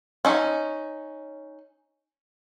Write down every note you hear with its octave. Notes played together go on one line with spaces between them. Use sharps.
C#4 D#4 E4 C#5